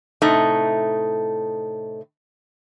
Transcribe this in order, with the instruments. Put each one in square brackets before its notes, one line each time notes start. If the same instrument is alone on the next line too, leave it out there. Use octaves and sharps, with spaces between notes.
[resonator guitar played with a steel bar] A2 C3 A3 D#4